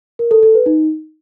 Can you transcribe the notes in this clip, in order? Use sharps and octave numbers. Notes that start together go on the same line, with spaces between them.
A#4
A4
A4
B4
D#4